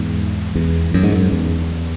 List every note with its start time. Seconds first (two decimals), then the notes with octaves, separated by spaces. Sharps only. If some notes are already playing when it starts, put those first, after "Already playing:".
Already playing: E2 G#2
0.55 E2
0.94 F#2
1.03 G#2
1.12 F#2
1.32 E2